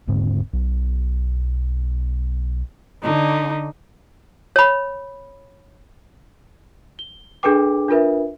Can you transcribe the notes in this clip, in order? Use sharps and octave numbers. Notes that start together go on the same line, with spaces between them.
D#1 G#2 D3 C4
B1
D3 D#4
C#5 B5
G7
D4 G#4 A4 B4 G5 D6
D4 F4 A#4 B4 E5